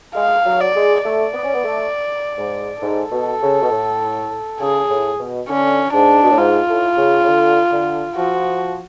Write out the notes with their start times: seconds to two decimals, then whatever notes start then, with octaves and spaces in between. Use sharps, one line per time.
0.15 G#3 F5
0.45 F#3
0.60 D5
0.76 G#3
1.04 A3 D5
1.34 B3
1.44 C#4
1.54 B3
1.64 A3
2.38 G#2
2.82 G#2 A4
3.12 B2
3.42 C#3
3.62 B2
3.71 A2
4.60 C#3 G#4
4.90 A2
5.19 B2
5.49 D3 C#4
5.93 G#2 D4
6.24 B2
6.30 A2
6.38 G#2 F4
6.68 A2
6.97 C#3
7.22 C#3
7.27 D3
7.71 D3
8.16 F3 F#4